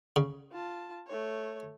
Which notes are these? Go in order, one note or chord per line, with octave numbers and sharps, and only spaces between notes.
C#3
F4 A5
A3 C#5